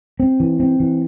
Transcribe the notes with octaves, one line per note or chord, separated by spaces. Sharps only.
C4
E3
C4
E3